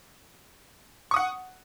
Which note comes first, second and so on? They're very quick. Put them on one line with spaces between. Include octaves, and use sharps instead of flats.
C#6 D#6 F#5